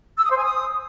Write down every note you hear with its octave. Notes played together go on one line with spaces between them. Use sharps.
E6
D#6
C5
G#5
D#6